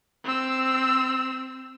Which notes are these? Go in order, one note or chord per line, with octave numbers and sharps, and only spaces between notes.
C4 E6